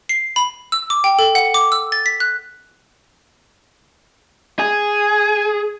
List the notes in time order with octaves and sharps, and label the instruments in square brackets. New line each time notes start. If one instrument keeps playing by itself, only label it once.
[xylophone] C7
B5
E6
D6
G5
A4
F#5
D6
E6
A6
B6
F#6
[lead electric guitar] G#4